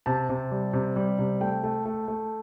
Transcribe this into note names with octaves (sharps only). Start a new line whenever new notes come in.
C3 A5
C3
G3
C3
G3
C3
A3 G5
A3
A3
A3